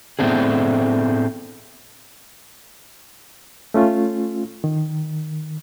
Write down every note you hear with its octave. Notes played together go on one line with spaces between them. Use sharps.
A2 A3 B3 C4 D4 G#4
A3 C#4 F4
D#3